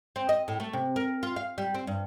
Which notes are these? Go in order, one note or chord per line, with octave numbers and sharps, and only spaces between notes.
C4
D#5
A2
A3
C3
A#4
F4
F5
G3
C4
G2